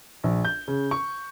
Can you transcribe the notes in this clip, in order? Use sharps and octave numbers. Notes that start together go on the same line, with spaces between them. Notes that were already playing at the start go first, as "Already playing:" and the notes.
A#1
G6
C#3
C#6